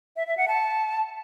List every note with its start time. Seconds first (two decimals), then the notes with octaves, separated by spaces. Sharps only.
0.16 E5
0.27 E5
0.37 F#5
0.48 A5